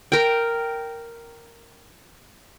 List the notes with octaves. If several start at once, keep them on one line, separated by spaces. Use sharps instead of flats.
A#4 G5